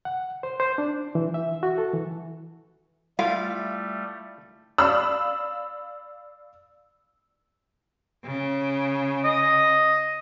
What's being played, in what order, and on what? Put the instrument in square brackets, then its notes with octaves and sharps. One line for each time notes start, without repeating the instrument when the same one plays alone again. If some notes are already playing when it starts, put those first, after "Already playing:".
[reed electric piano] F#5
C5
C5
D4
E3
E5
F#4
A4
E3
[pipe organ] G3 A3 [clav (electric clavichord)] E4 F4 [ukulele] F5
[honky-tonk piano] D5 F5 B5 D#6 E6
[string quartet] C#3
[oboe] D#5